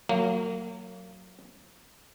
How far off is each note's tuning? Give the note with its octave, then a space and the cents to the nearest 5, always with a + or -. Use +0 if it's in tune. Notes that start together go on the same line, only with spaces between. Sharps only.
F#3 +0 A#3 -30